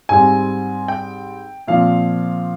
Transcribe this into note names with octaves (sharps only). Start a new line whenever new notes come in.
G#2 G3 C4 G#5
G5
A#2 F3 C4 F5